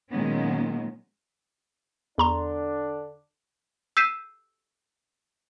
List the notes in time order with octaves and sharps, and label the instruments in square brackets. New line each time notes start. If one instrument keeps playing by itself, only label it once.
[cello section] A#2 D#3 F#3 G#3 B3 C#4
[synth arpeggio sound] E2 A#5 C6 [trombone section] D3 D4
[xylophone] E6 G6 B6 C7 D#7 E7